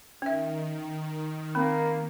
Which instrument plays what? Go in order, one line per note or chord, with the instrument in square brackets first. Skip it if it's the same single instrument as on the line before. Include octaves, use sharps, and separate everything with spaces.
[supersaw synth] D#3 [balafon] C#4 E5
[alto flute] A#3 [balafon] C4 [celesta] B5